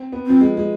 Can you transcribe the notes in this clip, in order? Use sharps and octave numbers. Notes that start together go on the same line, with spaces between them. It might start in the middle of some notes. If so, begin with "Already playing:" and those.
Already playing: C4
B3
F3 C4
G#3
G#3